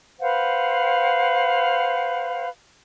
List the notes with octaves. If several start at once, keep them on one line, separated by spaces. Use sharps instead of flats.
B4 C5 F5 F#5